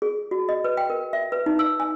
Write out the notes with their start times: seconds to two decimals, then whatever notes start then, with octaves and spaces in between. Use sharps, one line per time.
0.02 G#4
0.31 F#4
0.49 D#5
0.64 B4
0.77 G5
0.90 A#4
1.13 E5
1.32 B4
1.46 D#4
1.59 E6
1.80 G#5